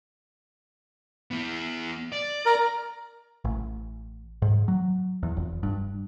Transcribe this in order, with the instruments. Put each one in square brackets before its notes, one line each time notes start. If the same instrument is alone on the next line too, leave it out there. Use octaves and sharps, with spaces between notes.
[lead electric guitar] B3 E4
D5
[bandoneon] A#4
[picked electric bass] A1
G#2
F#3
E2
F1
G2